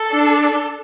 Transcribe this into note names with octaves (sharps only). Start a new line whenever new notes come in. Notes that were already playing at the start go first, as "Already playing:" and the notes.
Already playing: A4
D4